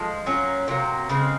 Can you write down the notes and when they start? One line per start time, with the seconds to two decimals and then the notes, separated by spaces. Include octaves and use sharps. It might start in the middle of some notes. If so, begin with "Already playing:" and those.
Already playing: F3 G#3
0.26 F#3 A#3 C#4 F4
0.68 C3 F#3 A#3
1.09 C#3 G#3 C4